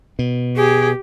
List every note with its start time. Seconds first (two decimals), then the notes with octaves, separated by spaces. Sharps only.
0.19 B2
0.56 G4 G#4